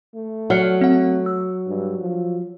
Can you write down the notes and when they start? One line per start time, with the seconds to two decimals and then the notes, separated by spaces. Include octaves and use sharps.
0.15 A3
0.50 F#3 D5 F6 C#7
0.81 C4 F#5
1.26 E6
1.67 G2
1.99 F3